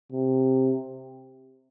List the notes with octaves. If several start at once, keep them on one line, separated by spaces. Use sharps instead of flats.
C3